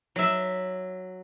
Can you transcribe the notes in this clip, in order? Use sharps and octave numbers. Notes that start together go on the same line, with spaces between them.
F#3 E5